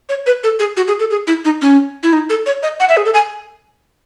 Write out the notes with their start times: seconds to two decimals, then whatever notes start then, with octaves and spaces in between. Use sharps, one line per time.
0.09 C#5
0.26 B4
0.44 A4
0.59 G#4
0.77 F#4
0.88 G#4
1.00 A4
1.11 G#4
1.27 E4
1.45 D#4
1.62 C#4
2.03 E4
2.13 D#4
2.30 A4
2.46 C#5
2.63 D#5
2.80 F#5
2.89 E5
2.97 G#4
3.05 A4
3.14 G#5